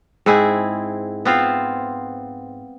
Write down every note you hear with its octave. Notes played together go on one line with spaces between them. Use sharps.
G#2 C4 E4 G#4
B3 C4 F4 C5